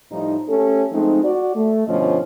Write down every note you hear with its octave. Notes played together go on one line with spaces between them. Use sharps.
A2 F3 G3 D#4
A3 C#4 G4 A4
F3 G#3 A3 C4 D#4
F#4 D5
A3
G2 B2 D3 F3 C#4 D#5